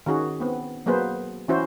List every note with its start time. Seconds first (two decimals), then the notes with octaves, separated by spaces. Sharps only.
0.06 D#3 C#4 F#4 G#4
0.40 B3 C4
0.86 F#3 A#3 B3 G#4 B4 C5
1.48 E3 C#4 E4 F#4 C5